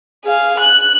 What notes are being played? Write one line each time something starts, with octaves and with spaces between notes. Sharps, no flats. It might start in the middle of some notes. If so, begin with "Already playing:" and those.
G#4 F5
F#6